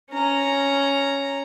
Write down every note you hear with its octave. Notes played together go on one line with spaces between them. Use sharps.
C#4 A#5